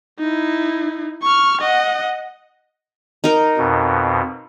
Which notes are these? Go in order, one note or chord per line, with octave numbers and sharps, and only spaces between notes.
D#4 E4
C#6 F6
D#5 F#5
D#4 A#4
F2 B2